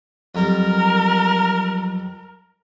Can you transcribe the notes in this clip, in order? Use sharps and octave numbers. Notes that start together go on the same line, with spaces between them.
F2 F#3 G3 A#4